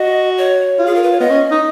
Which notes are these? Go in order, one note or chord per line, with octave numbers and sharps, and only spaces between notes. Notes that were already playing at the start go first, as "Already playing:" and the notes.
Already playing: F#4 D#5
C#5
F4
G#4
A#4
B4
C#5
B3 D#5
C#4
D#4